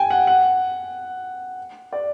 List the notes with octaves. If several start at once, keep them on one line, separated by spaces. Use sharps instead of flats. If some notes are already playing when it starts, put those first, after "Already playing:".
Already playing: G5 G#5
F#5
F#5
D5